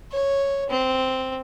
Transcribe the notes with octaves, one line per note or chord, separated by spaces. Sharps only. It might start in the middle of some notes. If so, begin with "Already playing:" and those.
C#5
C4